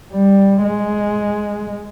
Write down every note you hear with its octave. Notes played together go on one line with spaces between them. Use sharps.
G3
G#3